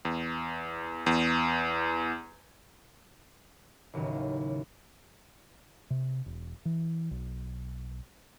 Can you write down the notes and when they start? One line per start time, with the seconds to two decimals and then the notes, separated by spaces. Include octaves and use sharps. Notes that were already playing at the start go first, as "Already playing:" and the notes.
0.05 E2
1.06 E2
3.93 A1 D#2 C#3 F#3
5.90 C3
6.26 E1
6.65 E3
7.11 B1